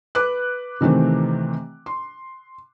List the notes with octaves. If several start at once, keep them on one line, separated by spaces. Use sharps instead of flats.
B4 D6 F#6
C3 D#3 E3 A3 C4
C6